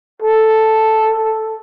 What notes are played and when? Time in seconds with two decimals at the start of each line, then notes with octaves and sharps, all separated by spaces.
0.22 A4